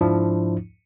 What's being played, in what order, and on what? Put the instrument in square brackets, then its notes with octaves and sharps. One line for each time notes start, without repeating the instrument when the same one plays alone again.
[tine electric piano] G#2 F3 D4 E4